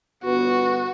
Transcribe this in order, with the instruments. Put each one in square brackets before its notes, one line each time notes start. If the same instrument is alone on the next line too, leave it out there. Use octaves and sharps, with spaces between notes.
[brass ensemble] G1 B3 B4 [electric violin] F#4